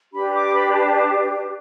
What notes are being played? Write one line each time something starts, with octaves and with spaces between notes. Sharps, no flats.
D4 G4 B4 B5
D6
B5
A5
A5